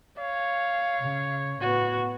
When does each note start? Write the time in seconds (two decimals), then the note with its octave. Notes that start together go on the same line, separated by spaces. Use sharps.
0.18 C#5 F5
1.00 C#3
1.61 A2 B3 F#4